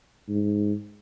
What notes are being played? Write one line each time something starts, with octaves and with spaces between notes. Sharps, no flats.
G#2